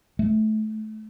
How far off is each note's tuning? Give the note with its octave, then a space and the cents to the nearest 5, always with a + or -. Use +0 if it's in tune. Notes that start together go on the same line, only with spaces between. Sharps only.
A3 -25